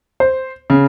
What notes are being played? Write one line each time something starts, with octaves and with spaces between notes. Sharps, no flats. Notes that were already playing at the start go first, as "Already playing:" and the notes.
C5
C#3